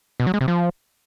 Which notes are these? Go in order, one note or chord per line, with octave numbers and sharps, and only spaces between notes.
B2
F#3
G#3
C3
F3